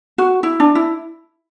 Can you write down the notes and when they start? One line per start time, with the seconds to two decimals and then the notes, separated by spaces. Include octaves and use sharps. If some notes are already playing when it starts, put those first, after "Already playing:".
0.18 F#4
0.43 E4
0.60 D4
0.75 E4